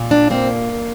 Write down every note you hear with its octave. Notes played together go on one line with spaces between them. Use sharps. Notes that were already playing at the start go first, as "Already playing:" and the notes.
Already playing: A#2
D4
A#3 C4